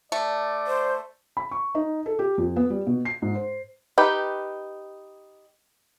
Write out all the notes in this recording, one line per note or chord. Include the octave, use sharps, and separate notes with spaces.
A3 D5
C5
B5
C#6
D#4
A4
G4
F2
B3
G3
B2
C7
G#2
C5
D#4 G4 B4